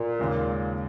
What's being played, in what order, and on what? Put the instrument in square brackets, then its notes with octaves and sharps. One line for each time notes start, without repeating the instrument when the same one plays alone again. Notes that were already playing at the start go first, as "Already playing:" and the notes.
Already playing: [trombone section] A#2
[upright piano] D#2 C#3 G#3